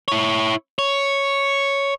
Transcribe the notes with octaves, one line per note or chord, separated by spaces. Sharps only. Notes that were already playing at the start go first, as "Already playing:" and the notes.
E4 C#5
C#5